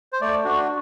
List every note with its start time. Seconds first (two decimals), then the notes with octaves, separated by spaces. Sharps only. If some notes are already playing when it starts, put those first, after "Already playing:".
0.13 C5
0.21 A3 D5
0.44 D4 F#4